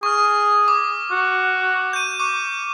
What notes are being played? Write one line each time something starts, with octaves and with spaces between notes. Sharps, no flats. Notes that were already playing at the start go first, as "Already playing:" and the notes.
G#4 C#6 F6
D6
F#4
G6 D#7
C#6 D6